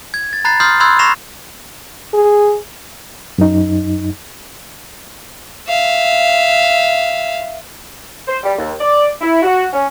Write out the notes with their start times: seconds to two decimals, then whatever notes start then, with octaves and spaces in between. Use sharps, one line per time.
0.14 G#6
0.33 A6
0.45 A#5 B5 F#6 A6 C7
0.60 C6 D#6 F6 G6 A6 C7
0.80 B5 C6 E6 F#6 G#6
0.99 C#6 A#6 C7 E7 F7
2.14 G#4
3.38 F#2 D#4
5.68 E5 F5
8.28 C5
8.44 G3
8.57 D#2
8.80 D5
9.21 E4
9.43 F#4
9.73 C#4